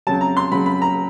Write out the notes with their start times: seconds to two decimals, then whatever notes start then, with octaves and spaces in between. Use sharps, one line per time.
0.07 F2 C#3 F#3 A5
0.21 A#5
0.37 C6
0.51 F2 C#3 F#3 B5
0.66 B5
0.82 A#5